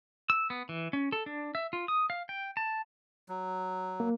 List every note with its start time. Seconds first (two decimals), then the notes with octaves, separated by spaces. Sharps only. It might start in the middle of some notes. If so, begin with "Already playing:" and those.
0.30 E6
0.50 B3
0.69 E3
0.93 C#4
1.12 A4
1.26 D4
1.55 E5
1.73 F4
1.88 D#6
2.10 F5
2.29 G5
2.57 A5
3.29 F#3
4.00 A#3